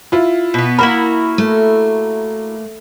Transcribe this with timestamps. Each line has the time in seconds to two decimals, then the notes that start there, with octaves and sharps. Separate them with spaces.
0.12 E4 F4
0.54 B2 B3
0.79 A#3 E4 F#4 A#4 B5
1.38 A3